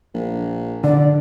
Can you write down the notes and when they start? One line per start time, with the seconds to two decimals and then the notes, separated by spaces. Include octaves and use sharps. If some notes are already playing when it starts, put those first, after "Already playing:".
0.14 A#1
0.84 D3 D5